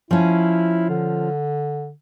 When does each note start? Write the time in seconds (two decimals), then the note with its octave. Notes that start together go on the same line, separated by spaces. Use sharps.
0.11 F3 C#4 E4
0.90 D3